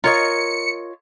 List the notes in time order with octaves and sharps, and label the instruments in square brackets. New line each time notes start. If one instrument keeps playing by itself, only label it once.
[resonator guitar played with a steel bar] F4 C#5 D#5 [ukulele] A#4 [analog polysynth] C#7